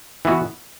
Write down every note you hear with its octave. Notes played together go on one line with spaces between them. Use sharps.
E3 B3 F#4